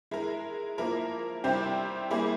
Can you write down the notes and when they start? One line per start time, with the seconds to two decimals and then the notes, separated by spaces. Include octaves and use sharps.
0.11 G#3 E4 A#4
0.78 F3 A#3 E4 A#4
1.44 C3 G3 C4 E4 G4
2.10 G3 A#3 E4 G#4